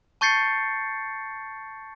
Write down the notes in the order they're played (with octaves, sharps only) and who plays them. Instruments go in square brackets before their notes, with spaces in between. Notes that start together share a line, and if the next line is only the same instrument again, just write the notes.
[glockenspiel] A5 C#6 G6 A6 C7 C#7